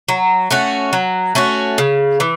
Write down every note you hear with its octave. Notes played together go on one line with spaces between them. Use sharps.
F#3
A3 C#4 F#4
F#3
A3 C#4 F#4
C#3
E3